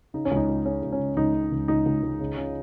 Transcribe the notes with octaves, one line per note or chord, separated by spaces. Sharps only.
C#3 D#4
C#4
C#2
D#4
C#2
C#3 C#4
C#2
C#4
C#3
C#2 D#4
C#3
C#2
C#2 D#4
C#2
C#2
C#3
C#3